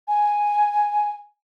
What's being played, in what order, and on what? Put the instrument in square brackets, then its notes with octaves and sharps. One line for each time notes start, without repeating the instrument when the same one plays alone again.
[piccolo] G#5